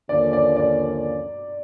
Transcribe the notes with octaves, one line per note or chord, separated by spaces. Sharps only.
D#2 D3 F3 A#3 C#4 D5
D5
D5